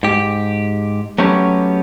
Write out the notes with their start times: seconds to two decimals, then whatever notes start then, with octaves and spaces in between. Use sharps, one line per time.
0.03 G#2 G4
1.18 F#3 A3 B3 C#4 G4